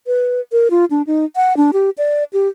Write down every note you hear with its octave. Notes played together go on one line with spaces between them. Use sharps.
B4
A#4
F4
D4
D#4
F#5
D4
G4
D5
G4